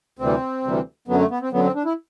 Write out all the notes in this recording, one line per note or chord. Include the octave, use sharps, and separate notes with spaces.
D2 C3 E3 G3 C4
D2 C3 E3 G3
F#2 D3 F#3 B3
A3
B3
C4
F#2 D3 F#3 B3
C4
D4
E4